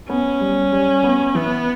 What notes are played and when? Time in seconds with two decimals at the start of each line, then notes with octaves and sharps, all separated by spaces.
0.09 B3 C#4
0.41 G3
0.72 G3
1.04 B3
1.35 E3 B3